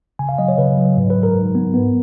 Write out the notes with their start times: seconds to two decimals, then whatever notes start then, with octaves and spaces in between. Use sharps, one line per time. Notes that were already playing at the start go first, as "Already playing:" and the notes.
0.19 C#3 G#5
0.29 F5
0.38 F#3 D#5
0.48 C#5
0.58 C#3 B4
0.78 F#3
0.97 G#2
1.10 B4
1.16 G#2
1.23 A#4
1.35 G#2
1.55 B3
1.74 B3